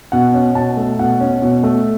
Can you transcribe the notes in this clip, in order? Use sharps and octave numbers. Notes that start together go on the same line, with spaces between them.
B2 F#5
C#4
B2 A5
A3
B2 F#5
C#4
B2
A3